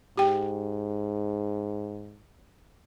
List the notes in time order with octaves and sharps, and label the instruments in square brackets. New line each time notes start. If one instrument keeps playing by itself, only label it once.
[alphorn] G#2 [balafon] G4 G5